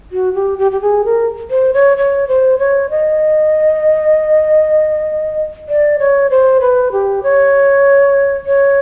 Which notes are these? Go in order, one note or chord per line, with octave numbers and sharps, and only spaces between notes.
F#4
G4
G4
G4
G#4
A#4
C5
C#5
C#5
C5
C#5
D#5
D5
C#5
C5
B4
G4
C#5
C#5